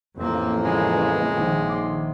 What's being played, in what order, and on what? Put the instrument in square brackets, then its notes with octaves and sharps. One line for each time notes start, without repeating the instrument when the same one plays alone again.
[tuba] A1 [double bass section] F2 A#3 [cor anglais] C4
[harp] C#3 [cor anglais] G#3
[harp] A#1 D#3 A3
D#5 C6 D6